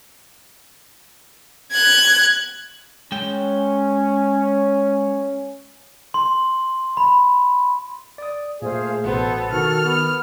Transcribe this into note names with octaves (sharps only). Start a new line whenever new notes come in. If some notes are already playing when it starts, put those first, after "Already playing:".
F#6 G#6
G#3 C#4 G5
C6
B5
D5 D#6
A#2 A3 G#4 C5 F5
A1 B2 B3 A4 C5
D#3 F#4 F6
B3